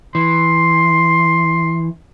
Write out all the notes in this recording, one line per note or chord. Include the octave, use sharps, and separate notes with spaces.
E3 C6